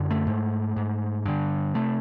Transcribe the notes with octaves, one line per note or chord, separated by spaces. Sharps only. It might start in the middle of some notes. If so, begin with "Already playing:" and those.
Already playing: F#2 D3
A3
G#2
G#2
G2 D3
C3 A3